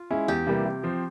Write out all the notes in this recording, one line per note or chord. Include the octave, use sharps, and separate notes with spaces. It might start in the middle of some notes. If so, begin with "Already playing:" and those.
Already playing: F4
G#3 C#4 E4
E2 G4
C3 E3 G3 A#3
C3
F3 C4